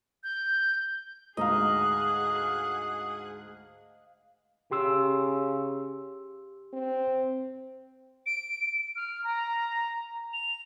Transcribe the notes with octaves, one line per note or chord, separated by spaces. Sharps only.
G6
D2 G#2 G#4 D#5 F5 F#5 A#5 D#6
C#3 G4 C6 E6
C4
D7
F6
A#5
F7